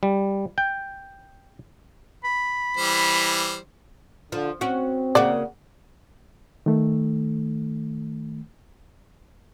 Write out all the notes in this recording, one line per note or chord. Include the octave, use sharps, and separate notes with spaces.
G3
G5
B5
E3 G3 C5
D3 F3
C4 C#4 F#4
C#3 A#3 F#4 D5
D#3 A3